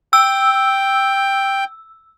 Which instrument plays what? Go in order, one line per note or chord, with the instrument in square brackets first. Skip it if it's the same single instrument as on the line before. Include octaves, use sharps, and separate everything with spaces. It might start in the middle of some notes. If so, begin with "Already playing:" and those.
[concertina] G5 [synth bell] E6